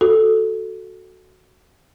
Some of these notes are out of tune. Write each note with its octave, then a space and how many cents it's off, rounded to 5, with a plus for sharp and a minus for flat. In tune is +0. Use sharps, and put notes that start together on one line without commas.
F#4 +0 A4 +0